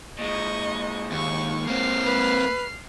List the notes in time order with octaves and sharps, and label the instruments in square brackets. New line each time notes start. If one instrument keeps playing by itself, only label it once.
[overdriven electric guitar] A#2 G#3 [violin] D#5 C#6
[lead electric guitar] D#2 [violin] C#6
[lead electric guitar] A#3 C4 [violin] F6 C7
[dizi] B4